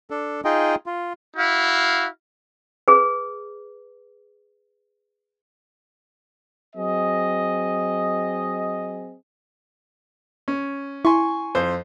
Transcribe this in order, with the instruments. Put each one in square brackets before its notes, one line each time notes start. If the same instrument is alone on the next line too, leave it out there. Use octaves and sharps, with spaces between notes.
[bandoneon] D4 A4
D#4 F4 G#4 D#5 G5
F4
[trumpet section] E4 F#4 F5
[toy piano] G#4 B4
[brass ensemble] F#3 C4 G#4 D#5
[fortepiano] C#4
[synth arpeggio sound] E4 [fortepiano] G#5 C6 C#6
[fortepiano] F2 C5